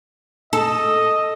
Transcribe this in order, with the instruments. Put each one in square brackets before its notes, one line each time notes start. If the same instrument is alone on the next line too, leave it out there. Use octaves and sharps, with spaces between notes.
[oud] A4 [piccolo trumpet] D#5